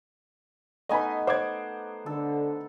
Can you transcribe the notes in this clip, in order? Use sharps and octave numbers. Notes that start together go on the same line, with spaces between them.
A3 B3 D#4 D#5 G#5 B5
C5 F#5 D6 G#6
D3 A4